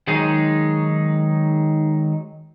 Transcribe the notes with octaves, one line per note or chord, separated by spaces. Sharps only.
D#3 F#3 G#3 D#4 G#4